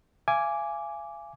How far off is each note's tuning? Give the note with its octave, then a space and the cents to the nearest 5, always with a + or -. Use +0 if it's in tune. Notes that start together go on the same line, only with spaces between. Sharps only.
F5 -40 G#5 +0 D6 -10